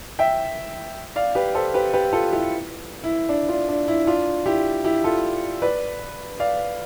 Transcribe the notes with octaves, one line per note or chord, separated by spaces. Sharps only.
E5 G5
D5 F5
G4 B4
A4 C5
G4 B4
G4 B4
F4 A4
E4 G4
E4
D4
D4 F4
D4
E4
D4 F4
E4 G4
E4 G4
F4 A4
B4 D5
D5 F5